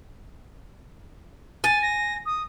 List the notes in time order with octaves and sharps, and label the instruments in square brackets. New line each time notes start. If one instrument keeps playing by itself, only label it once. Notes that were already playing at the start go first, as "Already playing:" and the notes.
[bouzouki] G#5 [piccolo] A6
[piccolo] A#6
D#6